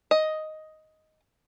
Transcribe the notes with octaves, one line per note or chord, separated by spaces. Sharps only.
D#5